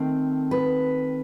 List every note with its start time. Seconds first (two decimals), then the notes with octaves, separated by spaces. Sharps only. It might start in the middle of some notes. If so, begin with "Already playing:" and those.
Already playing: D#3 A3 C4
0.51 B4